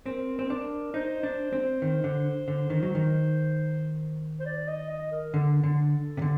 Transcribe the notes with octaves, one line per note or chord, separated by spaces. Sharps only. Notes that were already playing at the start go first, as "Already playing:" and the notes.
C4 A#4
C4
D4 A#4
D#4 C5
D4
C4
D#3
D3
D3
D#3
F#3
D#3
C5
D5
D#5
D#5
A#4
D3 A4
D3
C3
D3